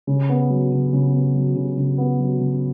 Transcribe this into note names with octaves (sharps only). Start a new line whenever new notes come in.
C#3
B3
F#3
C#3
C#3
B3
F#3
C#3
C#3
B3
F#3
C#3